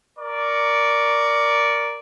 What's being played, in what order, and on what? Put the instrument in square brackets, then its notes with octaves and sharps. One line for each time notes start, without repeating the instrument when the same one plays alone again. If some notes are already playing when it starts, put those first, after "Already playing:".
[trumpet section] A#4 D5 C#6